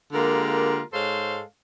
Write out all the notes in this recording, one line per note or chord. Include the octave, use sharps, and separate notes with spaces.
D3 G#3 A#3 F4 G4 A#4
G#2 G#3 A4 C5 C#5 F5